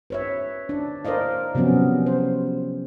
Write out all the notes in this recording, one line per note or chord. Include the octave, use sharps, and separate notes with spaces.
B4 C#5 E5
D4
A#4 C5 D5 D#5 F5
C3 F3 F#3 B3 C#4
C5